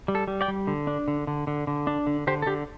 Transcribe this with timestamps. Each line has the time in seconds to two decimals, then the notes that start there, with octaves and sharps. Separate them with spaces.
0.08 G3
0.15 A4
0.28 G3
0.41 D5 G5
0.48 G3
0.67 D3
0.87 D4
1.08 D3
1.27 D3
1.47 D3
1.67 D3
1.87 D4
2.07 D3
2.27 D3 G4 C5
2.42 A4
2.47 D3 G4